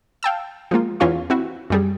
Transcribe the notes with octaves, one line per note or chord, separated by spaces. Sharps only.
F5 G5 A5 E6
F3 G#3 A#3 F4
E2 C#4 F4 F5 C#6
C4 E4 F#4
F#2 G3 G#4